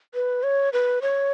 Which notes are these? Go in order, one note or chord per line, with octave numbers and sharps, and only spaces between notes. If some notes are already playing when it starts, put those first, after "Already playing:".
B4
C#5
B4
C#5